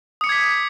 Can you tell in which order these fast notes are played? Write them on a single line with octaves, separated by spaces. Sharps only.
D#6 C#7 D6 G#6 B6